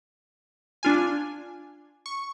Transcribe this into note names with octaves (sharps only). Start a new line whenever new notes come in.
D4 F4 G#5
C#6